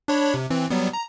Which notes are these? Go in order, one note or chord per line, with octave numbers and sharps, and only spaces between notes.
D4 C#5 B5
C3
E3 C4
F#3 G3 B3
A#5